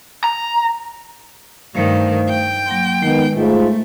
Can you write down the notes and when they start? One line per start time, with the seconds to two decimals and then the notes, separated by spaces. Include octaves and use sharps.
0.24 A#5
1.75 G2 D#3 A3 C5 F5
2.29 G5
2.66 F#3 A#3 C6
3.03 D#3 G#3 B3
3.36 G#2 A3 F4